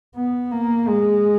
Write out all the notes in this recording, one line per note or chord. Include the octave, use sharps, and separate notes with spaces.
B3
A#3
G#3